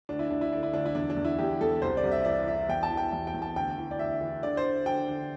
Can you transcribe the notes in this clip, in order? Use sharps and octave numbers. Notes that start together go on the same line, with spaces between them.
D2 D4
E4
D2 D4
E4
D3 D4
E4
D2 D4
E4
E2 D4
D4
E2
E4
E2 G4
E2 A4
C2 C5
D5
C2
E5
E3 D5
E3 E5
E2 G5
A5
E3
G5
E2 G5
G5
E2
A5
D2 G5
E3
D5
D2 E5
E3
D3 D5
C5
D3
D3 G5
D3